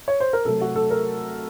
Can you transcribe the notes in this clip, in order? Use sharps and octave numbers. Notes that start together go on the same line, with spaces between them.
C#5
C5
A#4
C3 F#3 A3 A4
F#4
A4
A#4